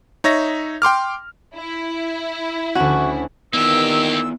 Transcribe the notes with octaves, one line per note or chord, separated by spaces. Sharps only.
D#4 C#5 E5 A#6
G5 C6 D6 F6
E4
D2 C#4 F#4
G2 D#3 A#3 B3 E4 F4 G4 E6